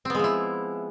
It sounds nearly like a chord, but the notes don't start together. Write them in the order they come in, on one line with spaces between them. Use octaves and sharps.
C4 B3 G#3 F3 E4